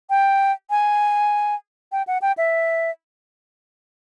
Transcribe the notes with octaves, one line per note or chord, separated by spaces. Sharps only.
G5
G#5
G5
F#5
G5
E5